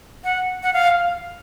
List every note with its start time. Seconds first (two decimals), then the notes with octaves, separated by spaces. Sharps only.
0.24 F#5
0.63 F#5
0.73 F5